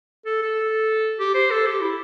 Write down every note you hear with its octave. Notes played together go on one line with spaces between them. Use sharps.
A4
A4
G4
C5
A4
G4
E4